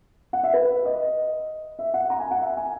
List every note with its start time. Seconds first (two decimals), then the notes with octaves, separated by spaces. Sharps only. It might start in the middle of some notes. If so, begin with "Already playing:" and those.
0.33 F#5
0.43 E5
0.53 B4
0.85 D#5
1.79 E5
1.94 F#5
2.10 A#5
2.20 G#5
2.31 F#5
2.41 E5
2.57 G#5